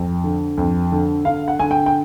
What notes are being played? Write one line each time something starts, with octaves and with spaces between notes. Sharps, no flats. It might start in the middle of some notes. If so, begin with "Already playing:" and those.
Already playing: F2
D3
F2
D3
D3 F5
F#5
D3 G#5
G5
G5